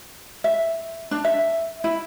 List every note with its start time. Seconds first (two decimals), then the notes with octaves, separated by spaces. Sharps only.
0.44 E5
1.11 D4
1.24 E5
1.84 E4